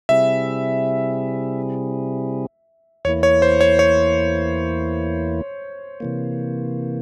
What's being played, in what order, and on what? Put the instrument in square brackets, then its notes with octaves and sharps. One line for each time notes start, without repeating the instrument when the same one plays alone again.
[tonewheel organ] C3 G3 C4 E4 G#4 [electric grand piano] E5
[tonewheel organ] E2 E3 A#3 E4 [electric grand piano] C#5
[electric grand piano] C#5
C5
C#5
C#5
[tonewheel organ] C3 E3 A#3